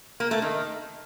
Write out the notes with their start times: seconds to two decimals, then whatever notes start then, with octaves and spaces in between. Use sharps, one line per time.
0.20 A#3
0.31 A3
0.42 D#3